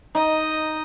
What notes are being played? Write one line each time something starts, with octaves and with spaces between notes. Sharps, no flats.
D#4 D#5